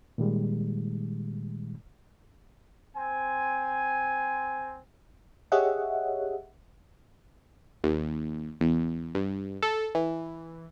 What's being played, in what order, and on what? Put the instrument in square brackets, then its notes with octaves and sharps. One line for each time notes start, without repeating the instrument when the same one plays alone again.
[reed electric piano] A#2 D#3 G3 G#3
[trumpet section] C4 G#5
[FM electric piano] G4 G#4 C#5 D#5 E5 F#5
[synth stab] D#2
E2
G2
A4
E3